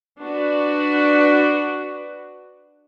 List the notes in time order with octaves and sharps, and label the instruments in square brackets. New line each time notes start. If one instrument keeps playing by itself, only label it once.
[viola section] D4 F#4 B4